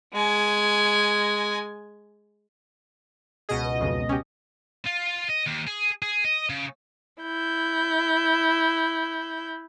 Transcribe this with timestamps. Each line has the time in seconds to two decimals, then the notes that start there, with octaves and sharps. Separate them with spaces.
0.13 G#3 G#5
3.49 C#2 B2 G#4 D#5
3.81 B1 F2 C#3
4.09 C#4 G4
4.86 F4
5.29 D#5
5.46 D#2
5.67 G#4
6.02 G#4
6.25 D#5
6.49 C#3
7.21 E4 G6